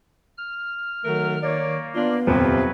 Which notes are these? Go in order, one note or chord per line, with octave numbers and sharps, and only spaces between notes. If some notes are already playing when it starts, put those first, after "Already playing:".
F6
D#3 F#3 A3 A#4
A#3 C#5 D5
B3 D4 F4
D#1 F2 C3 F3 F#3 B4